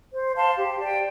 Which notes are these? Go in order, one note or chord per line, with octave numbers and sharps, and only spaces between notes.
C5
F5 A5 C6
G4
D5 G5